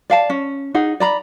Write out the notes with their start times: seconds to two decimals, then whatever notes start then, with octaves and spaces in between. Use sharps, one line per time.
0.10 D5 F5 A5
0.30 C#4
0.74 D#4 G#4 F#5
1.00 D5 A#5 B5